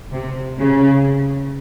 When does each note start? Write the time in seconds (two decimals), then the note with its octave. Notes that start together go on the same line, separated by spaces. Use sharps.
0.12 C3
0.57 C#3